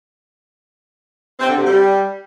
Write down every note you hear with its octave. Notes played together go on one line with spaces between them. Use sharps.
C4
D3
C3
G3